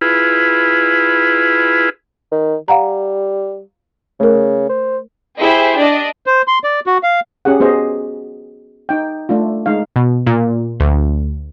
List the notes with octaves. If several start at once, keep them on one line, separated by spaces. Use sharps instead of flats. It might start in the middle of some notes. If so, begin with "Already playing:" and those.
E4 F4 G#4 B4
D#3
G3 F5 F#5 A#5
C#3 A3 A#4
C5
E4 G4 G#4 C5
D4 D5 D#5
C5
C6
D5
F#4
F5
C#4 G4 G#4 F#5
B3 F#4 G#4 C5 D#5
D#4 G5
A3 D4 F4
G#3 D#4 F5
B2
A#2
D2